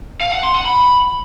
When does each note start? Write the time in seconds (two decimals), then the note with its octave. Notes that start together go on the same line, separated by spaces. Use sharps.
0.21 F5
0.32 F#5
0.43 C6
0.54 F#5
0.66 B5